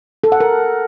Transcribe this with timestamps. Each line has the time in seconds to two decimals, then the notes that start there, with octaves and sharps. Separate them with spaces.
0.24 A4
0.32 F#5
0.40 A#4